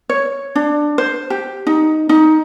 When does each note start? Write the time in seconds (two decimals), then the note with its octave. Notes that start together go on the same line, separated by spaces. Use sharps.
0.09 C#5
0.55 D4
0.98 C5
1.30 G4
1.67 D#4
2.09 D#4